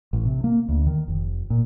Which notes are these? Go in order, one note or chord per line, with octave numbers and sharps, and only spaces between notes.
A1
C3
A#3
D2
D#3
F1
A#2